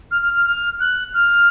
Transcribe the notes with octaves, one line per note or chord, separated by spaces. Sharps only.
F6
F6
F6
F6
F#6
F6